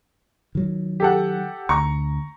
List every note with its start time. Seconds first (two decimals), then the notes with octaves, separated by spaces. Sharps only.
0.55 D#3 F#3
1.00 G4 A4 F#5
1.69 D2 A#5 C#6